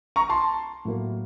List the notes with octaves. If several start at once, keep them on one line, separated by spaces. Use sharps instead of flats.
A#5 C#6
A5 C6
A2 F#3 A#3